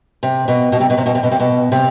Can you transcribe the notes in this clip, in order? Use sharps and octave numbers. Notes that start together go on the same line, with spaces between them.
C3
B2
B2
C3
B2
C3
B2
C3
B2
C3
B2
C3